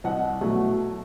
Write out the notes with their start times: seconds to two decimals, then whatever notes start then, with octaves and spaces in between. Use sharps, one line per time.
0.04 C2 D#5 F#5
0.41 B2 F#3 A3